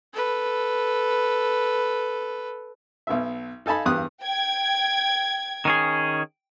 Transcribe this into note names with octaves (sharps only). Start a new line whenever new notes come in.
A4 B4
B1 B2 E5
D#4 A4 G#5 A5 B5
E2 G2 G4 D#6 F#6
G5 G#6
D#3 C#4 G#4